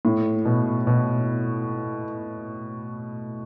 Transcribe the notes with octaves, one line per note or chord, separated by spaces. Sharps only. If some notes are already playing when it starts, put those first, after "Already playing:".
A2
B2
B2